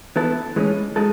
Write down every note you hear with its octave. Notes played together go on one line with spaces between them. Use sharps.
E3 B3 E4 A4
A2 E3 G#3 C#4
G#3 D#4 A4